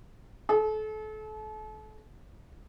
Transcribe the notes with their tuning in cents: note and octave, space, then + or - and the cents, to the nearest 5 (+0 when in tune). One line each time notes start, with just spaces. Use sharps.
A4 -35